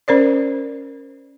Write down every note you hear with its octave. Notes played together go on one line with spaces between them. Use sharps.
C#4 A#4 C5 D5